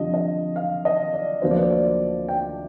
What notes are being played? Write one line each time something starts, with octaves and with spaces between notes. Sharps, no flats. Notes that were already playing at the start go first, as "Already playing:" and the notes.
Already playing: F2 D3 G3 D4 F4 D#5
D#5
F5
D#5
D5
D2 D3 F3 A#3 C5
D5
C5
D5
G5